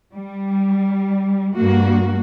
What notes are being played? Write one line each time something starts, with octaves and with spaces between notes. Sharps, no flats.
G3
G2 A#3 F#4